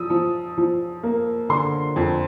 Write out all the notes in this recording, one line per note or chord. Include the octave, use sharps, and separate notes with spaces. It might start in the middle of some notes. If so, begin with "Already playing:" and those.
Already playing: F3 D#6 E6
F3
F3
A#3
D3 C6
F2